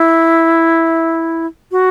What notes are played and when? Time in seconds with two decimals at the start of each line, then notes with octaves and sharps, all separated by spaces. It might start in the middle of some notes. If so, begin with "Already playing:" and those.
Already playing: E4
1.72 F#4